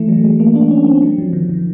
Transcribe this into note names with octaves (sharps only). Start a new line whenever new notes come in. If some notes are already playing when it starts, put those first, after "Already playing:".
Already playing: E3 A3
F#3
G#3
A#3
D4
C#4
C4
F#3
F3
D#3
D#3